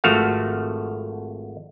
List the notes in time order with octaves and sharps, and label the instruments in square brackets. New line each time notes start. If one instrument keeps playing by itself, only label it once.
[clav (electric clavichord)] G#1 F3 A3 F#4 A4 F5